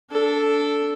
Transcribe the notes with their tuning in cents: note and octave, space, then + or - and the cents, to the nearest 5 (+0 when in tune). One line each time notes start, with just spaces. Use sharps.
D4 -20 A4 +0